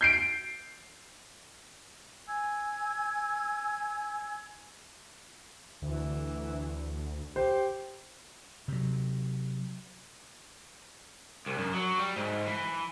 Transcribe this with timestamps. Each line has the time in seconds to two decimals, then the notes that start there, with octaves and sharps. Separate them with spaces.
0.01 G6 C7 D7
2.27 G#5 E6 G#6
5.82 D2 E3
7.36 G4 C5
8.68 C3 F#3
11.46 C2
11.58 F#2
11.74 F#3
11.98 G3
12.16 G#2
12.46 E3